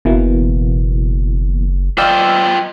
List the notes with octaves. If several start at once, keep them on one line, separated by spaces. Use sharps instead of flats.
F#1 B2 E3 A#3
F4 D5 D#5 F5 G5 E6